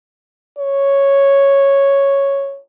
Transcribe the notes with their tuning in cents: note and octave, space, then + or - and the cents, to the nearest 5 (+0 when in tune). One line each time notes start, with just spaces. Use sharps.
C#5 -5